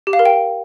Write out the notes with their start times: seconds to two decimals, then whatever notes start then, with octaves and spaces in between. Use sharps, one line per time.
0.07 G4
0.13 F5
0.19 A#4
0.26 G5